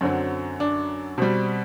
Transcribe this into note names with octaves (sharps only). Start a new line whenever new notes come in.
F#2 D3 F#3 C4
D4
B2 G3 C4